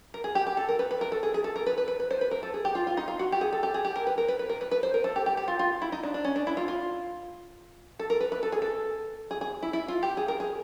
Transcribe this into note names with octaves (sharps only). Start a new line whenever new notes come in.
A#4
G#4
G4
G4
A4
A#4
B4
B4
A#4
A4
G#4
G#4
A4
A#4
B4
B4
B4
B4
C5
B4
A#4
A4
G#4
G4
F4
F4
D#4
F4
F#4
G4
G#4
A4
G4
G#4
G4
A#4
B4
A#4
B4
B4
A#4
B4
B4
C5
A#4
A4
G4
G4
G4
F4
F4
E4
D#4
D4
D4
C#4
D4
E4
F4
F4
A4
A#4
B4
B4
A4
G#4
A4
G#4
G#4
E4
E4
F4
G4
G#4
A#4
G#4